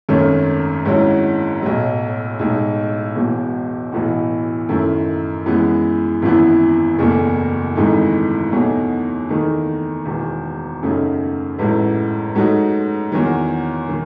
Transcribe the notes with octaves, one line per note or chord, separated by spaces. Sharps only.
G#1 F#2 D#3 A3 C#4
G#1 G#2 F#3 C#4 E4
B1 A2 F#3
B1 A2 G#3 D#4
E1 E2 B2 F#3
B1 A2 E3 B3 F#4
F#2 D#3 A3 E4
F#2 E3 G#3 B3
G#1 F#2 E3 B3 E4
F#1 E2 B2 A3
G#1 G#2 E3 A3 D#4
E2 B2 F#3 A3 D#4
E2 D#3 A3 D#4
E1 E2 D#3
F#2 C#3 F#3 A3 D#4
A1 G#2 F#3 A3 E4
G#2 F#3 A3 D#4 F#4
E2 D#3 F#3
D#3